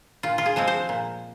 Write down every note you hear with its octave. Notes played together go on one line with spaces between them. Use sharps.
A#2 F4
F4
G#4
F3 G#3 C4
C5
A#2